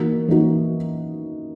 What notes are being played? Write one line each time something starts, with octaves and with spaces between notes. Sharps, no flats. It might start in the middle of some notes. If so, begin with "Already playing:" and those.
Already playing: E3 A#3 D#4 F#4
E3 A#3 D#4 F#4